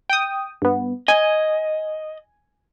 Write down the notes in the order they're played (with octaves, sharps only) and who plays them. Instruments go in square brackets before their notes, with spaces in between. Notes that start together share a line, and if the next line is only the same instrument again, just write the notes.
[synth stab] G5 D#6
G2 B3
[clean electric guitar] D#5 [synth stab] G#5